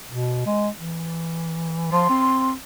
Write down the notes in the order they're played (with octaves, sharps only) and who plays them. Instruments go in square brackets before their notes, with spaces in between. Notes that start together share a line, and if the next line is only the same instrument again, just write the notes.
[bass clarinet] B2
G#3
E3
[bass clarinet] F3 [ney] C6
[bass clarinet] C4